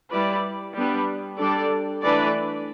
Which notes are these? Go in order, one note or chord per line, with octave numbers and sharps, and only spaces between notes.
G3 E4 B4 D5
G3 B3 D4 B4
G3 D4 A4 D5
E3 A3 D4 B4 D5